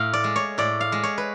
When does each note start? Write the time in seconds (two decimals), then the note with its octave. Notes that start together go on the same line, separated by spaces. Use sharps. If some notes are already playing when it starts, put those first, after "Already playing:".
Already playing: A2 F5
0.13 D5
0.24 G#3
0.36 C#5
0.58 A2 D5
0.80 F5
0.92 G#3
1.03 C#5
1.18 B4